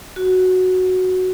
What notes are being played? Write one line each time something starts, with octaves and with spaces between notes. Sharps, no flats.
F#4